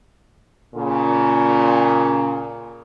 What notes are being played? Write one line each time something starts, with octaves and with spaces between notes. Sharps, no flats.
A#2 C#3